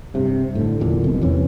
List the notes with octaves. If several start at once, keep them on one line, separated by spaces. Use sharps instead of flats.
G2 C3
A2 D3
F#1 E2 A#2 D3
C2 F2 B2
E2 C3 E3 C#4